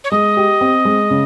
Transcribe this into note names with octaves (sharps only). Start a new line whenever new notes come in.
C#5
G#3 D#5
G4
C4
G#3
C#3